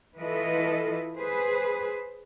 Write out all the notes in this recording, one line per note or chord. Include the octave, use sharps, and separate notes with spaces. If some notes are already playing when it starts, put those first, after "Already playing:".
E3 E4 F4 A4 B4 D#5
G#4 B4 C5